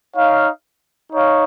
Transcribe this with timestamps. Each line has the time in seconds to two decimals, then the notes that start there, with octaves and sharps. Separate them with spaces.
0.15 D#4 C#5 F5
1.12 D#4 C#5 F5